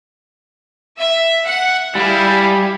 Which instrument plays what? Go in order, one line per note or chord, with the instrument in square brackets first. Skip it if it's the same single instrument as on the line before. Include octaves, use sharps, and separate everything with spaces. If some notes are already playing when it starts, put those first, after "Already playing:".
[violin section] E5
F#5
[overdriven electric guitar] G3 [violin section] E4 G#4 F5